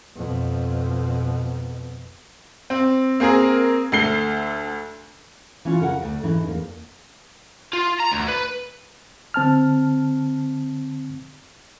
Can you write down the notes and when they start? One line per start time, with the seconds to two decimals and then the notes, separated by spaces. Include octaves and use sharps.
0.16 F2 B2
2.70 C4
3.20 A#3 C4 G#4 A#4
3.92 D2 A4 C7 G7
5.65 E3 C#4 F4
5.81 C#3 A#4 F#5
6.02 D2
6.23 G#2 E3 C#4 D#4
6.46 E2 A#3
7.73 F4
8.00 A#5
8.12 D2
8.28 B4
9.34 D3 C4 A5 F6